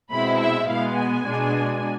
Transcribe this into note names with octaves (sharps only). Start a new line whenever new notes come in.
B2 G#3 C4 E4 B5
E5
B2 G#3 B3 F5
G#5
B2 G#3 D4